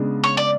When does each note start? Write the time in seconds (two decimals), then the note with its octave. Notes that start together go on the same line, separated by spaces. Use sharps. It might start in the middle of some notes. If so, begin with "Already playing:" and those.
Already playing: C#3 G#3 B3 D4
0.24 C#5
0.37 D5